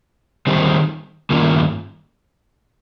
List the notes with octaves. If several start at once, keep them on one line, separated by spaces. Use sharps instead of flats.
D#3 G3 C4
G2 D#3 A#3 C#4 F4